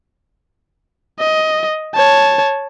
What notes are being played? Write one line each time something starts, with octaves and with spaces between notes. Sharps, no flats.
D#5
C#5 A5